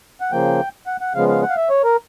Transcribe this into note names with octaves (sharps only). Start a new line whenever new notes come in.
F#5
C#3 F3 A#3 G5
F#5
F#5
C#3 F3 G#3 B3 F5
F5
F#5
F5
E5
C#5
A#4